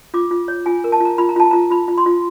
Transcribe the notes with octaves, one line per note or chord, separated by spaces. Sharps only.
F4 D6
F4
C#5
F4 G#5
A#4
A5
F4 A#5
F4 B5
A#5
F4 A5
F4 A#5
F4 B5
F4
C6
F4